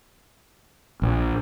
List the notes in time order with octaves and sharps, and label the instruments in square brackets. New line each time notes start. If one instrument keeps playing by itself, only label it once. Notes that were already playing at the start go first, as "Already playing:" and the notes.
[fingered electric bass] A#1